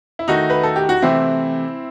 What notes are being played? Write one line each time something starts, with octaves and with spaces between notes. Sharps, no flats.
E4
D#3 A3 D#4 F#4
B4
A4
G4
F#4
C3 E3 A3 C4 E4